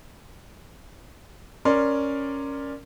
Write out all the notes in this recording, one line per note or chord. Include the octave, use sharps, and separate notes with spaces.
C#4 A#4 D5 C6